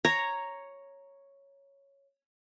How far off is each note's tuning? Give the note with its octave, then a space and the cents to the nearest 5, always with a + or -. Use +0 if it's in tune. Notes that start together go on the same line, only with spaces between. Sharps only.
C#5 +0 A#5 +0